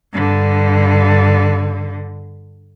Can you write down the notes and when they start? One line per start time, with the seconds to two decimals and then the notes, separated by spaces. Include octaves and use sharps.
0.13 G2 D3